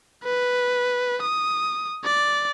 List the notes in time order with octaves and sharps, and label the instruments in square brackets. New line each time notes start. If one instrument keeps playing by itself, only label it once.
[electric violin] B4
D#6
D5